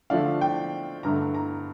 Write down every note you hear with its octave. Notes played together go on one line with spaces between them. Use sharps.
D3 F3 A3 D4 F5
G5
G2 D3 A3 A#5
A#5